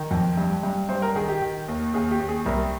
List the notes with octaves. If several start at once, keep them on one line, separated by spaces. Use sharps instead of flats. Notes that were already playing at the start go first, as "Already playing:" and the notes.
Already playing: D#3
F2
G2
G2
G2 C5
A#4
D#3 G#4
G4
D#3
D#2
D#2 G#4
G4
D#2
G#4
C2 A#4